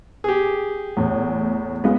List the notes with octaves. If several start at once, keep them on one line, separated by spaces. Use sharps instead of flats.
G4 G#4
E2 A2
G#3 B3 F4